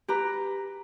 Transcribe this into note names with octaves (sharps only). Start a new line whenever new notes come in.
G4 B4 A#5